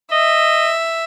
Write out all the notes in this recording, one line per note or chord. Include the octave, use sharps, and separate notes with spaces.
D#5 E5